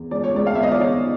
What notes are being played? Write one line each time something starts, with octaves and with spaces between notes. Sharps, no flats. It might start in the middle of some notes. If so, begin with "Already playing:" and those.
Already playing: E2
G#3 D5
C#5
G#3 D5
F5
B3 E5
D#5
D5
D#4 C#5